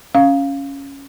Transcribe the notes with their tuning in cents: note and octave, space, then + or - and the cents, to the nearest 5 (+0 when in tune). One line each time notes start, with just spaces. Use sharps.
C#4 +0 F5 +0